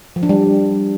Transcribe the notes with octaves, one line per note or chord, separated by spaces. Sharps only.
F3
D4
G3